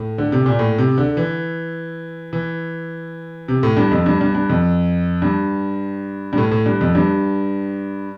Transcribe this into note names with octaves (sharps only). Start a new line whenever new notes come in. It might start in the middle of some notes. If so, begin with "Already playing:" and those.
Already playing: A2
D3
C3
A#2
A2
C3
D3
E3
E3
C3
A2
G2
F2
G2
G2
G2
F2
G2
G2
A2
A2
G2
F2
G2